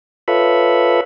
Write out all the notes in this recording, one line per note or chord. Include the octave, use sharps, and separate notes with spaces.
F4 A4 B4 C#5 E5 B5